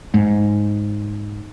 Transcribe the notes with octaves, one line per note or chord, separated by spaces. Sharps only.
G#2